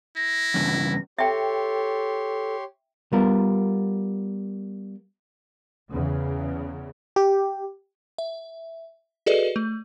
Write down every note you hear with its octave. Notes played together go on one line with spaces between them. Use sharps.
E4 A#6
E2 G2 C#3
G4 A4 C#5 E5 G5 C6
G3 B3 F4 A#4
E2 C#3
G4
E5
F#4 G#4 A4 B4 D5 D#5
A3